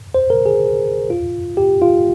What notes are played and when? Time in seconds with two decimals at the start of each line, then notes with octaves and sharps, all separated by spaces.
0.14 C5
0.30 A#4
0.46 G#4
1.10 F4
1.57 G4
1.82 F4